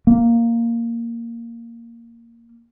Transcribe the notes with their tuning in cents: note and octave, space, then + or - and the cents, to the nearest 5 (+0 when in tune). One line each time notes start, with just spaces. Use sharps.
A#3 -5